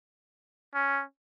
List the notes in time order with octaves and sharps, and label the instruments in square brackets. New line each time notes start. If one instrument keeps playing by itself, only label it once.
[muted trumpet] C#4